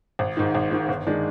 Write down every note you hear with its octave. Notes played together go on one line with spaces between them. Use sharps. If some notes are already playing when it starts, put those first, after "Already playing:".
G#1
G#2 D#3
G#1
G#2 D#3
G1
D#3 G#3 D4